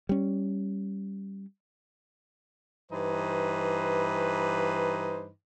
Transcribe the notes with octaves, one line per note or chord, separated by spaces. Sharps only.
G3 C#4
G2 E3 D#4 B4 C5